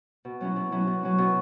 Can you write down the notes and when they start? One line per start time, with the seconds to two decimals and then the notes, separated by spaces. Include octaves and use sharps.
0.25 B2
0.41 F#3 C#4 E4
0.56 B2
0.72 F#3 C#4 E4
0.87 B2
1.03 F#3 C#4
1.18 B2